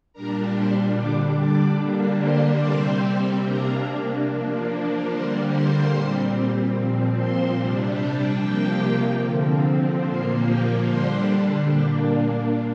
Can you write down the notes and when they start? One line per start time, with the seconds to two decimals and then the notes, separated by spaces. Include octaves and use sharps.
0.13 A#2 G3 D4 A#4 A#5
0.55 C5 C6
0.96 D3 G3 D4 D5 D6
1.37 D5 D6
1.79 D3 G3 A#3 D4
2.20 C5 C6
2.60 C3 G3 C4 C5 C6
3.44 C3 A#3 D4 A#4 A#5
4.27 F3 A#3 D4
5.09 D3 G3 A#3 C5 C6
5.50 C5 C6
5.91 A#2 G3 C4
6.74 A#2 F3 C4
7.14 C5 C6
7.56 C3 G3 D4
7.97 G4 G5
8.39 C3 F3 A#3 G4 G5
9.21 D3 F3 C4
10.03 A#2 F3 A#3 C5 C6
10.45 G4 G5
10.86 D3 G3 D4 C5 C6
11.68 A#2 A#3 D4 G4 G5
12.10 F4 F5